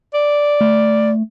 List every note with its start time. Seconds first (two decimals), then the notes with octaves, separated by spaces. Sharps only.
0.14 D5
0.61 A3